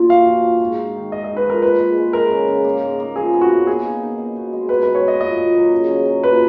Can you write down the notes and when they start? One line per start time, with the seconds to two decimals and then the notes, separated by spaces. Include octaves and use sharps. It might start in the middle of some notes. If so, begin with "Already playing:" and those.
Already playing: A#2 F4
0.09 F#4 F5
0.26 F3
0.44 F#4
0.60 G#2
0.78 D#4
0.95 D#3
1.12 G#3 D#5
1.24 D#4 D#5
1.37 B4
1.46 F3 A#4
1.62 A#2 B4
1.80 G#3
1.97 G#3
2.13 G#3 A#4
2.31 C#3
2.48 C#3
2.64 A#3
2.82 G#2
3.00 A#3
3.16 F3 G#4
3.33 B3
3.41 F#4
3.50 B3
3.67 A#3 G#4
3.85 D#4
4.02 D#4
4.18 B2
4.36 B2
4.53 G#3
4.69 F#4 B4
4.83 D#3 B4
4.95 C#5
5.03 A#3 D#5
5.21 A#2 D#5
5.38 A#2
5.55 F#3
5.72 C#3
5.88 C#3
6.06 F#3
6.23 A#2 B4